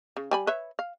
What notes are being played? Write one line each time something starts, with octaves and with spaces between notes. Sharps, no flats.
C#3
G3 G#5 B5
B4 C#5 E5
F5